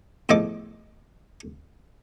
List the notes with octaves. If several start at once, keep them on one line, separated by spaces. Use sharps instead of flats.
E2 A2 F3 D#5 D6